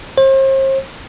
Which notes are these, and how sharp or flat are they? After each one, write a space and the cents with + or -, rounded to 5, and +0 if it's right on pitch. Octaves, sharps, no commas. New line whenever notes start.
C5 +40